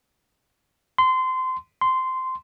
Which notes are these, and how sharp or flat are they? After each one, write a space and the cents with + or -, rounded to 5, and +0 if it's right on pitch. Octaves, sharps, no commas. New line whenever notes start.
C6 -25
C6 -15